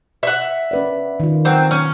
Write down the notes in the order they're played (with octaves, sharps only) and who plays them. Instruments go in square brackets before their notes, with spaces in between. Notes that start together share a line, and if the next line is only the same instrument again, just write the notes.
[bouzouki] E5 F#5
[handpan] C#4 B4 D5
D#3 F4
[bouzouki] F#3 C4
C#4